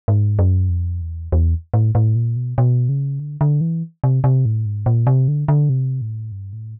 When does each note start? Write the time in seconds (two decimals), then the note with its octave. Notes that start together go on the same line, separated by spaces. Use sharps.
0.08 G#2
0.39 F#2
0.69 F2
1.01 E2
1.32 E2
1.74 A2
1.95 A2
2.16 A#2
2.36 B2
2.58 B2
2.89 C#3
3.20 D3
3.41 D3
3.61 E3
4.04 C3
4.24 C3
4.45 A2
4.66 G#2
4.86 A#2
5.07 C3
5.28 D3
5.48 D3
5.69 C3
6.02 A2
6.32 G2
6.53 A2